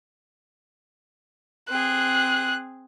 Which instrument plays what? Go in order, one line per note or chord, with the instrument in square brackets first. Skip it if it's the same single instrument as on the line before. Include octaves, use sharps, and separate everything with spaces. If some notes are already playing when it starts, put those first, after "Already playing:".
[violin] C4 G#4 [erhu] F#6